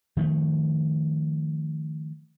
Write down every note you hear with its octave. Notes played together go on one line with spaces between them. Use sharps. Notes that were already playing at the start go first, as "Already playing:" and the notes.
D#3 F3 G#3 A3